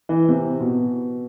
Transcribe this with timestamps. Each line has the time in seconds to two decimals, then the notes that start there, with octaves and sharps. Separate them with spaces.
0.09 E3
0.29 C3
0.60 B2